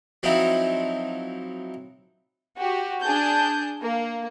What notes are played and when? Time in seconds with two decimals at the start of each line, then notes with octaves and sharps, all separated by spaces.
0.23 F3 F#3 C4 D#4 E4
2.57 F#4 G4
3.03 D4 G#4 A5 G6
3.82 A#3